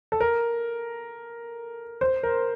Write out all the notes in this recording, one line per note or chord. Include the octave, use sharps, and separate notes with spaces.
A4
A#4
C5
A#4